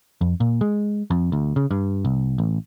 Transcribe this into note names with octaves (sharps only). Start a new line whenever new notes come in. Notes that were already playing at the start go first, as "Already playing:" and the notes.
F2
A#2
G#3
F2
D2
C#3
G2
C2
A1